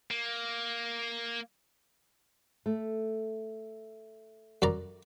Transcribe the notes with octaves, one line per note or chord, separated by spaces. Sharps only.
A#3
A3
F#2 D5 A#5